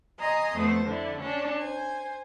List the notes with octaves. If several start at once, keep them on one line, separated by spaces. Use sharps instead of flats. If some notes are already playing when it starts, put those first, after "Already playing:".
D#5 G#5 A#5 C6 D#6
F2 A3 B3 C5
D3 E4
C#4 D4
C5 G#5